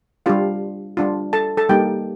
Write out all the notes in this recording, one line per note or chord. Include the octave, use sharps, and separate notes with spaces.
G3 D4 F4 G4 F5
G3 D4 F4
A4 A5
A4 A5
G3 A#3 D#4 G4 G5